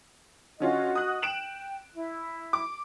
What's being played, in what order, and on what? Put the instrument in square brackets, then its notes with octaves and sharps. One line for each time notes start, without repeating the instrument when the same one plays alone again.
[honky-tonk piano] D3 C#4 F4 [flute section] F#4 D#5
[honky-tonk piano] D#6 F#6
[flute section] G5 [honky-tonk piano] D7 E7 F#7
[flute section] E4
[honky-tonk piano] D6